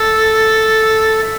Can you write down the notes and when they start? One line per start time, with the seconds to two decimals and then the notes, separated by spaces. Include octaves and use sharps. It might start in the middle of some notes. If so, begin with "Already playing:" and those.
Already playing: A4
1.23 E5